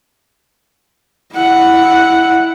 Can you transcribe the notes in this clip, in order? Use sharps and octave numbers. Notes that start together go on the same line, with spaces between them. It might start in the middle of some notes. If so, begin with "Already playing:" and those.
E4 F#5